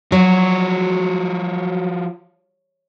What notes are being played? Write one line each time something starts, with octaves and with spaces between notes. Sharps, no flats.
F3 F#3 F#4